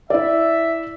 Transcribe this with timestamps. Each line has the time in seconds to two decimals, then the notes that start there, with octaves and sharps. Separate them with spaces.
0.10 E4 D5 E5